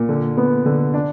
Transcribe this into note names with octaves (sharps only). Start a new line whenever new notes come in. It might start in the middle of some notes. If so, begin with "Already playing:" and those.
Already playing: A#2
D3
B3
D3
D4